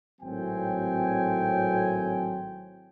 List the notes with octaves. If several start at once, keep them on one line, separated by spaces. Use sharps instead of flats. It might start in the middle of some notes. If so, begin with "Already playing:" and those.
G#1 A2 F#3 C4 G5 G#5